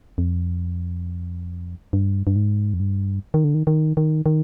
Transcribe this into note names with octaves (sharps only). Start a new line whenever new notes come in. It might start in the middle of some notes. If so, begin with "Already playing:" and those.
F2
G2
G2
G#2
F2
G2
D#3
D3
D#3
D#3
D#3
D#3